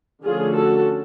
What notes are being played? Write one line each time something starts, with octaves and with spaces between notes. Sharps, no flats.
D3 F3 A3 C#4 F4 G#4
F#4 A4